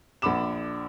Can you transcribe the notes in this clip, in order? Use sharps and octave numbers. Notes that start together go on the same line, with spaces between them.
A#1 D4 F#5 B5 D6 E7